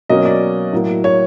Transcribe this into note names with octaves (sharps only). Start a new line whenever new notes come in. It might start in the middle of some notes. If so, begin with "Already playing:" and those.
B2 F#3 A#3 C#4 D#5
D5
A2 F#3 A#3
C#5